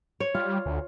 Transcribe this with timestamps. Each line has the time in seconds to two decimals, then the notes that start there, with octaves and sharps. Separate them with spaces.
0.20 C#5
0.35 G3 F4
0.66 D2